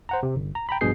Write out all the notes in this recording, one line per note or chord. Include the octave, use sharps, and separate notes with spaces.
C5 F#5 A#5
C3
G1
A#5
G5 A#5 B5
A#1 G2 B2 G#4 G6 C7